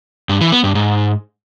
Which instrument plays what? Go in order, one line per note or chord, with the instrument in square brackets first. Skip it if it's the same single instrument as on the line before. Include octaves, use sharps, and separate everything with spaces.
[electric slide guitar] G2
E3
B3
G2
G#2